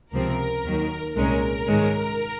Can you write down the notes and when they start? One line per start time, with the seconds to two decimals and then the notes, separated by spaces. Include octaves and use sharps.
0.12 C#2 C3 F3 C4 A#4
0.64 D#2 D#3 F#3
1.15 C2 A#2 G#3 C#4 A#4
1.66 G#2 D#3 G#3 C#4